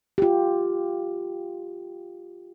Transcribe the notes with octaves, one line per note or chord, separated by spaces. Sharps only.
F4 G4